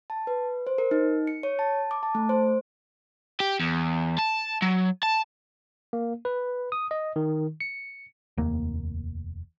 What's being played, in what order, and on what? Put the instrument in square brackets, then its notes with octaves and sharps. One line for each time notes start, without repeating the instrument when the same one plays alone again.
[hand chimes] A5
B4
C5
A#4
D#4
C#7
C#5
A5
D6
A5
A3
C5
[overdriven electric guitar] G4
E2
A5
F#3
A5
[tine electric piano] A#3
B4
D#6
D#5
D#3
C#7
[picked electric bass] F1 D#2 A#3